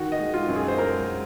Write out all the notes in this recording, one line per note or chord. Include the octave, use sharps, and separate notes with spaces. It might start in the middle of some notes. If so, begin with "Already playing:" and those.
Already playing: D#3 F#4
D#5
G#3
F4
F#2
G#4
C5
G#3 A#4
G#3